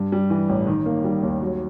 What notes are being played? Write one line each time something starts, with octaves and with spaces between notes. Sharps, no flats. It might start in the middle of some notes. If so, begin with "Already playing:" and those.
Already playing: G2
G3
E3
A1
D#3
A#3
G3
D#2
F#3